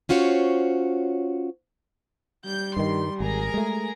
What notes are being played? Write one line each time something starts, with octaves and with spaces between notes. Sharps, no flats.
C#4 F4 F#4 C5 C#5
G3 G6
G2 D#3 C6
G#1 G#4 A#4 A#5
G#3 A3